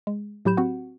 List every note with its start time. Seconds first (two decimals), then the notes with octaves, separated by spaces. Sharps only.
0.07 G#3
0.45 A2 F#3 G4 B5 G6 E7
0.57 C4 F#4 F#5